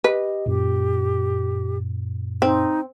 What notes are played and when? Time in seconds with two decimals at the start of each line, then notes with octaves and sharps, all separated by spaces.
0.04 G4 B4 D#5
0.46 F#2 A#2 G4
2.42 C4 D#4